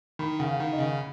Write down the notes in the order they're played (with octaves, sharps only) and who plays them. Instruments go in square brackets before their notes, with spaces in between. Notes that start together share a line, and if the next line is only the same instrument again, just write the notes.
[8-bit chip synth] D#3 [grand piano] B5
[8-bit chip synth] C#3 [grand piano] F#5
[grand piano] F5
[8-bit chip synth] D#3
[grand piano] D#5
[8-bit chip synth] C#3